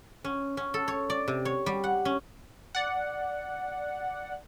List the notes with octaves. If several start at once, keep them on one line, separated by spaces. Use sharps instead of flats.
C#4
C#4
A4
C#5
D5
C3
C#5
G3
F#5
C#4
D5 F#5